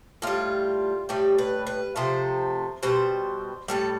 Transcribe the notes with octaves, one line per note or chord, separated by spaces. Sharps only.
A2 G3 F4
A2 G3 G4
B4
B4
C3 F3 A3 C5
B2 G3 C5
A2 G3 A4